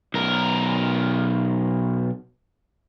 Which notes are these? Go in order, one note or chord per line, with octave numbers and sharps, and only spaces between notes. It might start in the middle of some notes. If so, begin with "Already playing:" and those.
B1 A#4